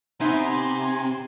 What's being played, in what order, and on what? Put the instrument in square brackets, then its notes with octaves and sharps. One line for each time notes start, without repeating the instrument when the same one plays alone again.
[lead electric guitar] C3 [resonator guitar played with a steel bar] B3 D#4 E5 [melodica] G#5 A#5 C6